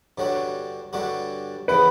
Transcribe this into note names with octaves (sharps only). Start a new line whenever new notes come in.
G2 D3 G3 D4 F#4 C#5
G2 D3 G3 D4 F#4
C#3 E3 B3 B4